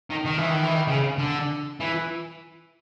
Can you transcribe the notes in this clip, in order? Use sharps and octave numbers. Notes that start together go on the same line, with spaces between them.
D#3
D#3
E3
D#3
E3
D#3
C#3
D3
E3